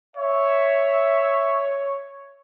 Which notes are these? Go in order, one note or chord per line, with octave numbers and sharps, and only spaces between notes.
C#5 E5